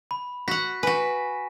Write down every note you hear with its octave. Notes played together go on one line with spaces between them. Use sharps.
B5
F#4 F#5 B6
F#4 B4 G#5